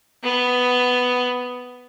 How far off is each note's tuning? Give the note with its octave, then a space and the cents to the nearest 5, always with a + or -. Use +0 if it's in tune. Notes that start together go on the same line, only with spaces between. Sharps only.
B3 +5